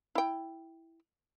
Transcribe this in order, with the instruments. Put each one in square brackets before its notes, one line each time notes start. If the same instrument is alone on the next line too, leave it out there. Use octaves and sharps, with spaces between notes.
[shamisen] E4 G5